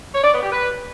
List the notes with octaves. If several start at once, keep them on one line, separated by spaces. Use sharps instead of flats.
C#5
D5
B3
G4
B4